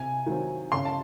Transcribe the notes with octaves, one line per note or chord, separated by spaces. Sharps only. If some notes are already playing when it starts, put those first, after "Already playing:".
Already playing: C3 G#5
D#3 F#3 C4
C#3 C6
A5